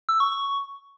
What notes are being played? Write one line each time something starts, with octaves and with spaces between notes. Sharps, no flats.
E6
C#6
C#6